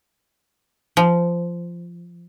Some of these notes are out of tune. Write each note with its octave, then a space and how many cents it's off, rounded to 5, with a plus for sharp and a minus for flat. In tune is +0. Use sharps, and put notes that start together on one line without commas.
F3 -15